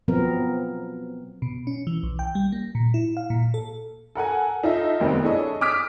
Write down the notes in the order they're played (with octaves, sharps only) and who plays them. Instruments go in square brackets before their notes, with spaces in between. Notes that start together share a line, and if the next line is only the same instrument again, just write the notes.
[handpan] B2 F3 F#3 B3 C4 A#4
[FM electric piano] B2
C#4
E3
B1
G5
G3
A#3
A#2
E4
F5
A#2
A4
[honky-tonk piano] A4 A#4 F#5 G#5
D#4 F4 A4 E5
F1 D#3 G3 B3 C4
D4 E4 G#4 A4 C#5 D#5
D6 D#6 F6 B6 D7